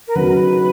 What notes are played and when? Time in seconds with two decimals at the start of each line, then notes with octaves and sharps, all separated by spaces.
0.08 A#4
0.15 C#3 F#3 B3 D#4 F#4 B4